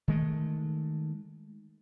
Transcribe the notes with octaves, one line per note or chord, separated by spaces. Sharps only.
D#3 G#3 A3